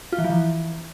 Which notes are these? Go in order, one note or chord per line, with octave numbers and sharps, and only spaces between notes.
F4
E3
F3
E3